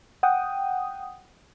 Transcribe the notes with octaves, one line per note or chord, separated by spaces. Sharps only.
F#5 G5 D#6